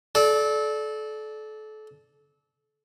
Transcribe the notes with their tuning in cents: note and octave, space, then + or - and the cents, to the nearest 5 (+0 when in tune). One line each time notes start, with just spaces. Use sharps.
A4 -30 D5 +0